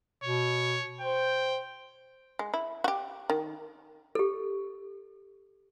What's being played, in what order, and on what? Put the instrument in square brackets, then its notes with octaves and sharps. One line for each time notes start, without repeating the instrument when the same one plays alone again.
[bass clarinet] B2 [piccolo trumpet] C#5
[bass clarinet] C5 [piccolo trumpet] G5
[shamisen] G#3
E4
F#4 G4
D#3
[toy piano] G4 A4